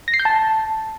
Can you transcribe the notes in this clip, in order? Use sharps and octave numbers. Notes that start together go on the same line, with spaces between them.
A#6
C7
G6
A5